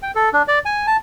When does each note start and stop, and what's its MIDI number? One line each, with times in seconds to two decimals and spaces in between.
0.02 0.11 79
0.15 0.29 69
0.33 0.42 62
0.48 0.59 74
0.65 0.86 80
0.87 0.97 81